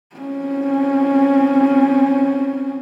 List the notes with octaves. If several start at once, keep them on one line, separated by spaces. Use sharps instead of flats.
C4 C#4